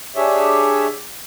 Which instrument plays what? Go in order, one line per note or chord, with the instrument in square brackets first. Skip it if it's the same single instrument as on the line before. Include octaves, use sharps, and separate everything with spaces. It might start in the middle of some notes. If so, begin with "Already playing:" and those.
[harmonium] D4 G4 G#4 C#5 E5